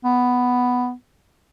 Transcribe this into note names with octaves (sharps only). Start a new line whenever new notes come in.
B3